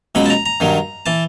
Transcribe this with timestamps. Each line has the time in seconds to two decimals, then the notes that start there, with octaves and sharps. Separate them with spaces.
0.15 C#2 B2 F#3 B5
0.26 A5
0.30 A#5
0.46 A#5
0.60 G2 D#3 F#3
1.06 E3 A5